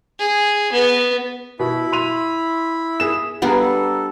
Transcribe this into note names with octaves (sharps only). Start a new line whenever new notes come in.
G#4
B3
B2 E4 B5
C6 D#7 F7
G#4 E7
G3 B3 D4 G#4 F5 F#5 A#5
A4